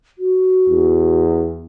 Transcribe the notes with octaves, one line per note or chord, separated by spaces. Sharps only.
F#4
E2